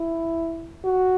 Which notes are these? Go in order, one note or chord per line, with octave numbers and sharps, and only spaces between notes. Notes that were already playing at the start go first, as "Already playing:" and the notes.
Already playing: E4
F#4